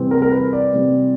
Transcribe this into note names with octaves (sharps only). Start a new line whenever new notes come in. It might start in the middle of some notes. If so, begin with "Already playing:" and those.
Already playing: C3 E3 G3 C4
A#4
A#4
B4
D5
C3 E3 G3 C4